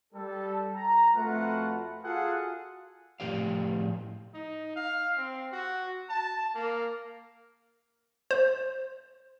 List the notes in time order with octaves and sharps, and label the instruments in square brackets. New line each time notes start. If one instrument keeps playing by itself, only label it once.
[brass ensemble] G3 A4
A#5
F2 A3 F4 F#4 B4 F#5
F4 F#4 G#4 A4 F5 F#5
[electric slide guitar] A2 F3 G4 D5 F5
[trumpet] D#4
F5
C4
F#4
A5
A#3
[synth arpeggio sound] C5